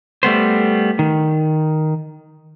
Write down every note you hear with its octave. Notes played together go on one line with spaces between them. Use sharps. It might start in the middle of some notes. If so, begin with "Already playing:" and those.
G3 A3 B3 C5
D#3